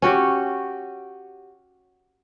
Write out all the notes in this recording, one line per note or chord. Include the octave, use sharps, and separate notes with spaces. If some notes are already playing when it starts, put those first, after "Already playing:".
C#4 F#4 G4